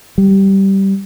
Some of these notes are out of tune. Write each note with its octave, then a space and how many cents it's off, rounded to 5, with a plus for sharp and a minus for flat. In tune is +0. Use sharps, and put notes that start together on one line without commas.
G3 -10